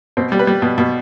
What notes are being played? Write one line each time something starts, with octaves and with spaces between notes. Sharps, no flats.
B2 C4
G3
B4
G3
B2
B2